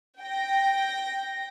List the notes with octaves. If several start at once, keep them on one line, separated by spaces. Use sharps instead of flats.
G5 A#6